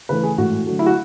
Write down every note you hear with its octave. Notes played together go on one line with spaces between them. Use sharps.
C#3 E3 A3 B4
G#4
A2 E3 G#3 F#4
D3 F#3 A3
E4
F#4